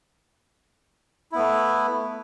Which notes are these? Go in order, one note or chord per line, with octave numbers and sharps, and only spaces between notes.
A3 B3 E4